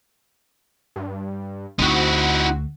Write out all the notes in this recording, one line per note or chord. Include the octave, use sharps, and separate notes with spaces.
G2
D2 C4 D#4 E4 F#4